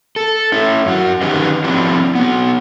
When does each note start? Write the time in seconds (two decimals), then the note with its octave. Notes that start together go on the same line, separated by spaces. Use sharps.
0.16 A4
0.52 C#4 E4
0.86 F#2 F#3 F#4
1.21 D#3 C#4 D#4 G4 B4 D#5
1.64 F3 F#3 C4 D4 E4
2.15 F#3 B3